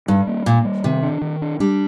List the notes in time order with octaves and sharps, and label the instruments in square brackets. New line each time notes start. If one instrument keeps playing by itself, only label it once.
[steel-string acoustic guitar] G2 [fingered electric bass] G3
[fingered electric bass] A#3
[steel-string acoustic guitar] A#2 [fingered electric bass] A#3
[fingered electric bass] G3
[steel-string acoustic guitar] C3 [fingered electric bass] D#3
[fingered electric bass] D4
D#3
D4
[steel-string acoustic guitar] G3 [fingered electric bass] D4